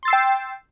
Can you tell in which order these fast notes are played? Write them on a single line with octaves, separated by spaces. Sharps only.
C6 A6 E6 C7 G5